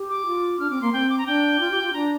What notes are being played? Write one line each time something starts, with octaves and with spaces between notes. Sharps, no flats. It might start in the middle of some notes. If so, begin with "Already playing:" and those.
Already playing: G4
D6
F4
D4 F6
C4 D6
A#3 C6
C4 G5
D6
A#5
D4 G5
F4
G4
F4
D4 A#5